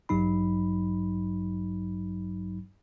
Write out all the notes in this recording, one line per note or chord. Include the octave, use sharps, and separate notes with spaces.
A1 G2 F#3 D#4 B5